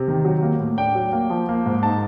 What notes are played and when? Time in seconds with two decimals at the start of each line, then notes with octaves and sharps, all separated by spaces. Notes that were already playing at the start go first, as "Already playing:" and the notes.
Already playing: C3
0.08 D#3
0.25 F#3
0.43 A#3
0.60 A2
0.78 D4 G5
0.95 F#3
1.13 A#3
1.30 F3
1.49 A#3
1.66 G#2
1.83 D#4 A5